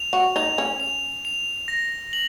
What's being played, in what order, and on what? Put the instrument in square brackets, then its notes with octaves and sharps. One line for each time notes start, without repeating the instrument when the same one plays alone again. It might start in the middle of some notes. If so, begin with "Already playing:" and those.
Already playing: [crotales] F7
[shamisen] F#4
[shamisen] D#4 [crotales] F7
[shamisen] C#4
[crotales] F7
F7
A#6
F#7